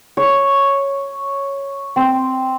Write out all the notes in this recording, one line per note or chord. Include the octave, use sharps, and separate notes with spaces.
C#5
C4